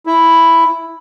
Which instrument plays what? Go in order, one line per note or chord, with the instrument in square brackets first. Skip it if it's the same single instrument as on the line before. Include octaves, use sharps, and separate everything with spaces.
[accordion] E4